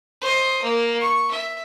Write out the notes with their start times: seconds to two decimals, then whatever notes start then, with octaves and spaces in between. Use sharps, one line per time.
0.21 C5 D#5
0.63 A#3
1.00 C#6
1.31 E5